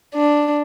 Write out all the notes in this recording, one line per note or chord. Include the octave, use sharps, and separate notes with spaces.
D4